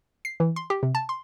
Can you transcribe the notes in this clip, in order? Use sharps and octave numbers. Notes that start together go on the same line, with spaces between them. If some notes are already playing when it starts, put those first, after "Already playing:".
C7
E3
C6
G4
C3
A5
C6